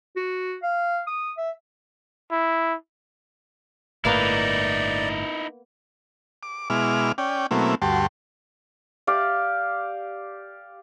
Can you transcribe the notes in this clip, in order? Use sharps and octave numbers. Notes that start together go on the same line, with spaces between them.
F#4
F5
D#6
E5
E4
G1 A2 A#3 B3 D#4 E4 D5 F5
D6
B2 G#3 E4 D6 F6
C#4 D5 G5
B2 F#3 A3 A#3 C4 E4
D2 G2 F#4 G4 A5 C6
G4 D5 F5